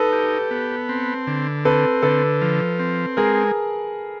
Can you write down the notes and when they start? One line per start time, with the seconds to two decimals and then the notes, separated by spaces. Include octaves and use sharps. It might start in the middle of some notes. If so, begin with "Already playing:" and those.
Already playing: D#4 A4 B4
0.13 G4
0.51 B3
0.89 C4
1.27 D3
1.65 C4 A4 B4
2.03 D3 A4 B4
2.42 F3
2.79 C4
3.17 G#3 G#4 A#4